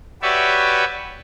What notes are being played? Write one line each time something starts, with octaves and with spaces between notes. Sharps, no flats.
F#4 G4 B4 C#5 D5 E5